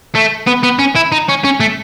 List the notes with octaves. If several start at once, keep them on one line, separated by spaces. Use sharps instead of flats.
A3
B3
B3
C#4
E4
D#4
C#4
C#4
A3